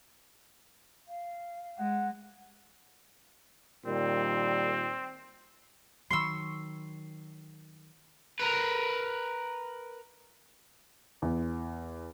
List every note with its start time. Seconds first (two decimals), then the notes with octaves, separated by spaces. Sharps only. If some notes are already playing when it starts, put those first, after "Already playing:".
1.07 F5
1.78 G#3 F#5
3.86 A#2 D#3 G3 C4
6.11 D#3 F#3 C6 C#6 E6 C7
8.40 A#4 B4
11.22 E2